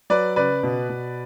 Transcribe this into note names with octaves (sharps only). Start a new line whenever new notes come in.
F#3 B4 D5
C#3 B4 D5
B2
B2